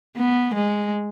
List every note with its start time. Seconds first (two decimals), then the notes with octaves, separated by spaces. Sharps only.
0.18 B3
0.55 G#3